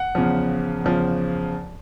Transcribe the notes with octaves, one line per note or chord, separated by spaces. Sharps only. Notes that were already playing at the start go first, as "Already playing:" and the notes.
Already playing: F#5
E2 C#3 F3
E2 C#3 F3